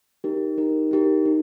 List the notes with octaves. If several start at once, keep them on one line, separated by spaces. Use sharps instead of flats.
D#4 G4 A#4
D#4 G4 A#4
D#4 G4 A#4
D#4